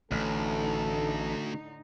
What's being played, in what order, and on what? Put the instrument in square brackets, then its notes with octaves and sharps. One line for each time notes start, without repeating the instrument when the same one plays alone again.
[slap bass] A1 [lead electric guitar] D2 [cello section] A2 D3 D#4 [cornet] A4